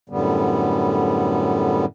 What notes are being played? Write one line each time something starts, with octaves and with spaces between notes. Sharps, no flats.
F#2 A2 D3 G3 B3